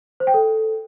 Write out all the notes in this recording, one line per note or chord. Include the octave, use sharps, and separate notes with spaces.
C5
G5
A4